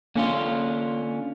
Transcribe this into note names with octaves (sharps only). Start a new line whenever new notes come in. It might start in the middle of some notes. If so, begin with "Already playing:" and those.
D3 A#3 C#4 F4